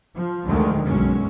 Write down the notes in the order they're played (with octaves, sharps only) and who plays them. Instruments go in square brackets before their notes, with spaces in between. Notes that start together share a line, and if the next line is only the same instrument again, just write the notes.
[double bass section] F3
D2 D3 D#3 F3 G#3 A3
B1 F#2 F#3 G#3 C#4